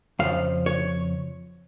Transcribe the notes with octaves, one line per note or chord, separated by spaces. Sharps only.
F2 C#3 F3 F5
C#5